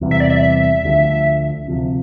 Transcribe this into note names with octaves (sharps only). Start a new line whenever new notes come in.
E2 C3 G3
E5
D5
E5
D2 D3 F3 A3
D2 C3 F3